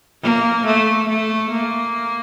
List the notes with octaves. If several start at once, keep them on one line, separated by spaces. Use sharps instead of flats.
A#3
A3
A3
A#3